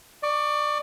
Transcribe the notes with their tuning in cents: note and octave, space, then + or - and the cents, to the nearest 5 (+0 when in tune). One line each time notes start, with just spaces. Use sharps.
D5 +25 C#6 +35